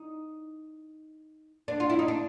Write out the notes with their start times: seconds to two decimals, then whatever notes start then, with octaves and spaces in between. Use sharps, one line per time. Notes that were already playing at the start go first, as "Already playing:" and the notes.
Already playing: D#4
1.68 D4
1.80 F4
1.90 E4
1.99 D#4
2.08 D4